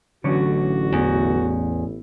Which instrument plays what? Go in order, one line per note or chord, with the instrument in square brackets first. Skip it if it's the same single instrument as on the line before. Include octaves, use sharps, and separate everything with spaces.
[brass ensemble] A1 [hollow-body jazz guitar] D3 F#3 C#4 [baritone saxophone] F#4
[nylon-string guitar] E2